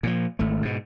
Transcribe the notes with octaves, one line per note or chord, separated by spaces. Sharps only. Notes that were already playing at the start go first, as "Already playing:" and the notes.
A#2 E3 F3
G#1 A3
G#2 B2